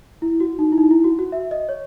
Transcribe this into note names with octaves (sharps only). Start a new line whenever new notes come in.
E4
F#4
D#4
E4
D#4
E4
F#4
F#4
E5
D#5
C#5